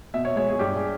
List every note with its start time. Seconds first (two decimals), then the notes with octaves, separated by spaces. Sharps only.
0.14 B2 E5
0.25 C#5
0.36 G#3 C#5
0.49 G#4
0.59 G2 G4
0.76 G#4